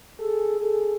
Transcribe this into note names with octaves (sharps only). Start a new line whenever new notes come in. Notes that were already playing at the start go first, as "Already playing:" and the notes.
G#4 A4
G#4 A4